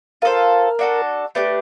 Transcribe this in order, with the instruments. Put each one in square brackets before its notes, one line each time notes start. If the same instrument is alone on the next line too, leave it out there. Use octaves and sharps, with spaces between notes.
[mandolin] F4 A4 C5 [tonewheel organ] A#4
[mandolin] D4 F#4 A4
[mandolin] A3 D4 G4 [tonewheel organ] B4